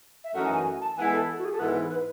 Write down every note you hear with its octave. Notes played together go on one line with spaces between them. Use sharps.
E5
F#2 E3 A3 D#4 F#4 F#5
G#5
G#5
A5
E3 G#3 B3 E4 G#5
A4
F#4
G#4
A4
G#2 E3 B3 E4 B4
B4